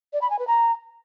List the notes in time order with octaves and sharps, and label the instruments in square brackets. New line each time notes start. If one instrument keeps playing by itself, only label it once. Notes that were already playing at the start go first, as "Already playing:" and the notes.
[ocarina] D5
B5
G#5
B4
A#5